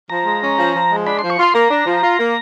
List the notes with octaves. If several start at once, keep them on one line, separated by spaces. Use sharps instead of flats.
F3 A#5
G#3
C#4
F3
F3
G#3
D4 B5
F3 C6
C#6
F4 C6
A#3 A#5
D4
F3
F4
A#3